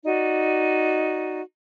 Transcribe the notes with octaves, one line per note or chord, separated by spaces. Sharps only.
D#4 F#4 D5